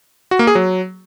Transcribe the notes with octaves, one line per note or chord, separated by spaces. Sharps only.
F#4
A#3
G#4
F#3